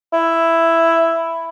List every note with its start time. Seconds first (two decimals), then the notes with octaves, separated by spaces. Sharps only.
0.13 E4